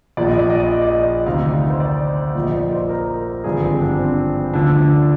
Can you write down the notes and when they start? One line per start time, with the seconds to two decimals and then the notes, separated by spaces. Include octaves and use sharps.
0.17 A#1 A#2 F3 D5
0.27 D#5
0.39 D5
0.50 D#5
0.60 D5
0.71 D#5
0.82 D5
1.26 D2 C3 D#3 F5
1.70 C5
1.80 D5
2.35 A#1 A#2 F3
2.42 D#5
2.54 D5
2.71 C5
2.89 A#4
3.44 G#1 G2 D3 F3 G#4
3.63 C4
3.81 D4
3.99 C4
4.53 D2 D3 F3 D4